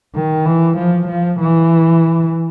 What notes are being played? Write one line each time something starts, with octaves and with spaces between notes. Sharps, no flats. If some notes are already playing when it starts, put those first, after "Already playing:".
D#3
E3
F3
F3
E3